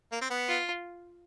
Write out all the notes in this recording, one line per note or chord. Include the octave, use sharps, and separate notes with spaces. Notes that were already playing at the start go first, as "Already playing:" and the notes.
A#3
C4
B3
F4